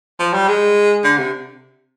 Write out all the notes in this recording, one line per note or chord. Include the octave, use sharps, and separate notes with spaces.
F3
G3
G#3
D3
C3